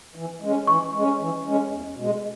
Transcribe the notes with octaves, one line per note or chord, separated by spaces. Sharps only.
E3
G#3 C#4
E3 C#6
G#3
C#4
E3
G#3 C#4
E2
B2 G#3